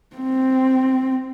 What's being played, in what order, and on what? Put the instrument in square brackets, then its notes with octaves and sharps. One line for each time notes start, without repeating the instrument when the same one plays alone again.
[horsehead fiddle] C4